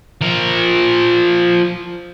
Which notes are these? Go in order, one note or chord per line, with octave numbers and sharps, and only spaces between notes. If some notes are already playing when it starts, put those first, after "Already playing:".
F3 A#4